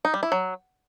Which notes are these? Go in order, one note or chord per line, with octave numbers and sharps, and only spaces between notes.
D#4
G3
E4
F#3